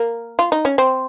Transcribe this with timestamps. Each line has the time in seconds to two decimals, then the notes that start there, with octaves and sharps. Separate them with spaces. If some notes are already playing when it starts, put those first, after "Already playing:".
Already playing: A#3
0.39 F4
0.52 D#4
0.65 C#4
0.78 C4